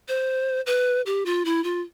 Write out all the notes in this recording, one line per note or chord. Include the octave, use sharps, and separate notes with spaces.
C5
B4
G4
F4
E4
F4